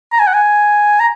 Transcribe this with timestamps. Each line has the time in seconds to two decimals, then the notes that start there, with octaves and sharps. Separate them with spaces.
0.12 A#5
0.20 G#5
0.27 F#5
0.34 G#5
1.00 A#5